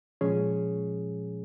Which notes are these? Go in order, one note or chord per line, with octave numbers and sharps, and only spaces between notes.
A#2 F3 G#3 C#4 G#4